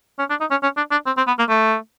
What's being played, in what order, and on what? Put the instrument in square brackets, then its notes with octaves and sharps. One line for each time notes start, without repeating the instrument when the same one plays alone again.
[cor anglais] C#4
D4
D#4
C#4
C#4
D4
D4
C4
C4
B3
A#3
A3